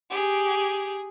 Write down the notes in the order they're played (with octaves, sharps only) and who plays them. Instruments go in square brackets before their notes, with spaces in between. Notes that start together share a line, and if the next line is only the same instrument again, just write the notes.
[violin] G4 G#4